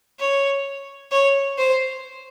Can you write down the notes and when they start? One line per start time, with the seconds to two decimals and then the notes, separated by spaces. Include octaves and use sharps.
0.20 C#5
1.12 C#5
1.58 C5